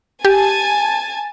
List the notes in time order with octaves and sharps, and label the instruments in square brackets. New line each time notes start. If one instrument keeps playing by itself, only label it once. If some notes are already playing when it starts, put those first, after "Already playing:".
[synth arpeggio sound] G4 [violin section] G#5 A5